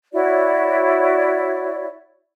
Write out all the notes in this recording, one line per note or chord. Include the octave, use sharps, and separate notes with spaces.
E4 F#4 C#5 D5